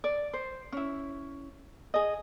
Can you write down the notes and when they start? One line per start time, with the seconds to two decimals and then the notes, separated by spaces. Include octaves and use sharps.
0.04 D5
0.33 C5
0.72 C#4 E4
1.94 G#4 D#5